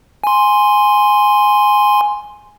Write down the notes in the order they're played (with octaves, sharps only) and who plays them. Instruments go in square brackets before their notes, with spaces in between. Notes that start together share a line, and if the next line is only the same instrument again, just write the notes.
[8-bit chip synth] G#5 C6